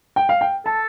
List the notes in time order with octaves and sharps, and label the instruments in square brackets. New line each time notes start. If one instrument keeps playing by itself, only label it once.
[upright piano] G5
F5
G5
[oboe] A4 [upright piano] A5